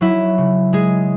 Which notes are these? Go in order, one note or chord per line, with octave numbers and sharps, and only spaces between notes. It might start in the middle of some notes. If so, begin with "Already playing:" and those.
F#3 E4
C#3
G#3 G#4